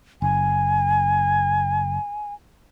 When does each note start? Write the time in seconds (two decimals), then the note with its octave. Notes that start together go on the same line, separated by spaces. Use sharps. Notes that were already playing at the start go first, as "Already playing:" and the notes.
0.22 F#1 G#5